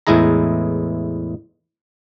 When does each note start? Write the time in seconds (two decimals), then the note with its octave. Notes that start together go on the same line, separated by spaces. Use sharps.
0.07 E2 A2 G#3 E4 G#4 A#5